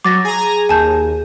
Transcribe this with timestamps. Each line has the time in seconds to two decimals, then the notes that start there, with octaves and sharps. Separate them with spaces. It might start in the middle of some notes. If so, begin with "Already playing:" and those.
0.05 F#3 D6 A6 A#6
0.25 G#4 G#5 A#5
0.69 D#2 G#5 A5 G6